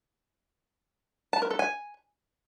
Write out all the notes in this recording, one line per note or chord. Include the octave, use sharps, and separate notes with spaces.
A5
A#4
A4
G#5